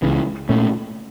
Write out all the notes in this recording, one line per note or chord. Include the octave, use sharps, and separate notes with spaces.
C#2 C#3 E3
A#2 A3 C#4